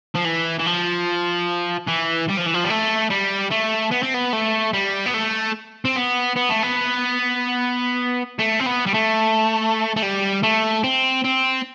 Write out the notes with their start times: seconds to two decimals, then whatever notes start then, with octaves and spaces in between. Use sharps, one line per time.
0.15 F3
0.25 E3
0.59 E3
0.66 F3
1.88 E3
2.29 G3
2.37 F3
2.46 E3
2.54 F3
2.64 G3
2.70 A3
3.10 G3
3.51 A3
3.92 B3
4.03 C4
4.14 B3
4.33 A3
4.73 G3
5.06 B3
5.14 A3
5.85 C4
5.96 B3
6.36 B3
6.49 A3
6.62 B3
8.39 A3
8.60 C4
8.66 B3
8.86 G3
8.94 A3
9.96 A3
10.02 G3
10.43 A3
10.84 C4
11.24 C4